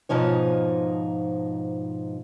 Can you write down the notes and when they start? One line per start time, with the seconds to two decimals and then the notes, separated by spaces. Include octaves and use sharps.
0.09 G#2 B2 F3 D#4 C#5